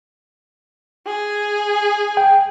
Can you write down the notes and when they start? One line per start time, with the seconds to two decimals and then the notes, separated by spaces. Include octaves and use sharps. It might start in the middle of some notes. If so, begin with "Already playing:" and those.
1.06 G#4
2.17 G5